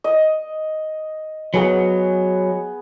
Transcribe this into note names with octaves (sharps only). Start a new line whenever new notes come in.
D#5
F#3 B3 G#4 B4